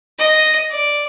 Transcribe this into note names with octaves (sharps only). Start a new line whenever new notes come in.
D#5
D5